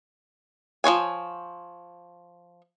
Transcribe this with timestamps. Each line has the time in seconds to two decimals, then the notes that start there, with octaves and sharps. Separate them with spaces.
0.84 F3 F#4 C#5 G#5